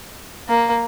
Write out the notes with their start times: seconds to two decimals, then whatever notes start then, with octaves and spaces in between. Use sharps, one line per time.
0.49 A#3